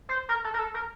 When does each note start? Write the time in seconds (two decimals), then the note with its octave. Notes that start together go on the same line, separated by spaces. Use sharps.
0.09 C5
0.29 A#4
0.44 A4
0.54 A#4
0.59 A4
0.74 A#4